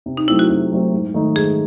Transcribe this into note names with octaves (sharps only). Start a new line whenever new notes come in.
C3
D#4
F#3 A3 C4 E4
F#4
C3
F#3 A3 C4
G#2
D#3 A3 D#4
G#2 G#4